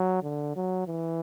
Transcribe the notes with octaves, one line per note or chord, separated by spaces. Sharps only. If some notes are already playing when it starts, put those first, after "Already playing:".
Already playing: F#3
D3
F#3
E3